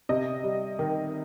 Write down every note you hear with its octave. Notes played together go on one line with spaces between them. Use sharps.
C3 D#5
G3
D#3